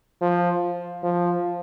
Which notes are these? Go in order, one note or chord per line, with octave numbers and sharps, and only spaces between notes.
F3
F3